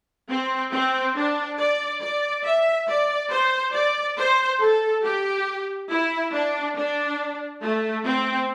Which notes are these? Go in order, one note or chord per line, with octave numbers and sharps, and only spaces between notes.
C4
C4
D4
D5
D5
E5
D5
C5
D5
C5
A4
G4
E4
D4
D4
A3
C4